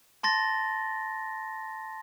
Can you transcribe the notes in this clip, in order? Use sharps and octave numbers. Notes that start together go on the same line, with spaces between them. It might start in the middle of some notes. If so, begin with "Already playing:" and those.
A5 C6 A6 A#6